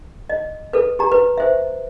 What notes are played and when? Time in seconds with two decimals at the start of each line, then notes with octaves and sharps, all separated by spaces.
0.30 D#5
0.73 A4 B4
0.99 G4 A#5
1.12 B4
1.38 C5 E5